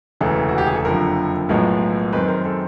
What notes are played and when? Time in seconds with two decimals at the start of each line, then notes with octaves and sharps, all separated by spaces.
0.20 E1 D2 C#3 E3 A4
0.49 F#4
0.58 G4
0.66 G#4
0.76 A4
0.85 F#1 F2 D3 F3 A#4
1.49 B1 A2 F3 G#3 B3 A#4
2.13 F#2 D#3 G#3 C4 B4
2.28 A#4
2.45 A4